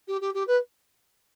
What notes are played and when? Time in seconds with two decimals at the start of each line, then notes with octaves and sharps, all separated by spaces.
0.08 G4
0.21 G4
0.34 G4
0.48 B4